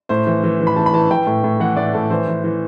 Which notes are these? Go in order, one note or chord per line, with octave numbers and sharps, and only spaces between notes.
A2 C5
E3
E3
E3
B5
E3 A5
B5
E3 A5
E3 G5
A2
A2
E3 F#5
A2 D5
A2 A4
E3 C5
E3
E3